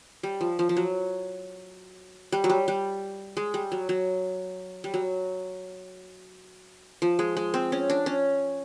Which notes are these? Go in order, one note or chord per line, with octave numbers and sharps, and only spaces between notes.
G3
F3
F3
F3
F#3
G3
F#3
G3
G3
G#3
G3
F#3
F#3
G3
F#3
F3
G#3
G#3
C4
C#4
D4
C#4